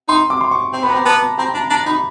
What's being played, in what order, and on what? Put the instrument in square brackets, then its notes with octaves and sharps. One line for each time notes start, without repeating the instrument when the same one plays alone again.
[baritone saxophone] D#4 [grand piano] C6
[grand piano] D6
C6
C#6
[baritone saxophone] C4
[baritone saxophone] B3 [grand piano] B5
[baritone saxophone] C4 [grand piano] A#5
[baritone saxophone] B3 [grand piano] A5
[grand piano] A#5
[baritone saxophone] C4 [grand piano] A#5
[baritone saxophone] D4 [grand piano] A#5
[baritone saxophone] D4 [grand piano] A#5
[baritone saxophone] D#4 [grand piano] B5